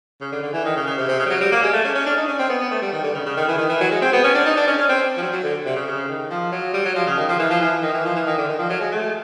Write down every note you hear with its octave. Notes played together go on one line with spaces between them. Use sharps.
C#3
D3
D3
E3
D#3
C#3
C#3
C3
C3
C#3
G3
F#3
G3
A#3
G#3
A3
C#4
C#4
D4
D#4
C#4
C4
B3
B3
A3
G3
D#3
D3
C#3
C#3
D#3
E3
D#3
E3
F#3
G#3
C4
B3
C#4
D4
D#4
D4
C#4
C#4
C4
F3
F#3
F#3
D3
C3
C#3
C#3
D#3
F3
F#3
G3
F#3
F3
C#3
D#3
F3
E3
F3
E3
D#3
E3
F3
E3
D#3
D3
D#3
F3
F#3
G#3
A3